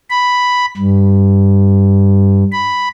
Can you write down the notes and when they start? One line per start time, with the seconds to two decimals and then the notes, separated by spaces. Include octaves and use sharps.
0.10 B5
0.77 G2
2.52 B5